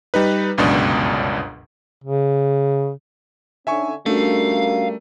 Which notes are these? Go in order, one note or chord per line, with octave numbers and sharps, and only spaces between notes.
G3 D#4 B4
G1 C#2 F#2 B2 D4
C#3
D3 C#4 D#4 E5 G#5 C#6
G3 A3 C#4 D4 F#4 A#4 F5